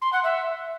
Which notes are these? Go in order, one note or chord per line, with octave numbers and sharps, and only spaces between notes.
C6
F#5
E5